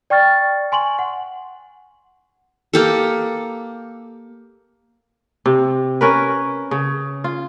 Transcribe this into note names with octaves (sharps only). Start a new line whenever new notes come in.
D5 G5 C#6 F6 A6
G#5 C6 C#6 F#7
F#5
A#3 G4 A4
C3
C#4 A#4 B4
C#3
F4